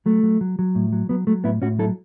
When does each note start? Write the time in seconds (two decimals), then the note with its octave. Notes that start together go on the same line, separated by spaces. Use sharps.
0.06 F#3 A3
0.23 F#3
0.41 F#3
0.59 F#3
0.75 A2
0.93 F#3
1.09 F#3 B3
1.27 F#3 A3
1.44 A2 B3 E4
1.62 A2 C#4 F#4
1.79 F#3 E4 A4